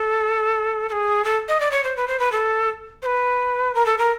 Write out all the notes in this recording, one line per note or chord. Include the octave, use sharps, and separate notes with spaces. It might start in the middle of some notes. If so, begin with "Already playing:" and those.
Already playing: A4
A4
G#4
A4
D#5
D5
C#5
C5
B4
C5
B4
A4
C5
B4
A#4
A4
A#4